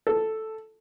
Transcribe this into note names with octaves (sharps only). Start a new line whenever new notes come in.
A4